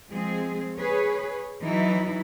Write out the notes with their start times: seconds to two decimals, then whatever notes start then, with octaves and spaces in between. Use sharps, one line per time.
0.11 F3 G#3 C4 G#4
0.76 G#4 B4 C#5
1.62 E3 F#3 D#4 E4